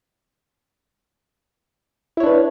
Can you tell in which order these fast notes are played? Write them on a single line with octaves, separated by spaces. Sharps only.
E4 C#5 D4 B4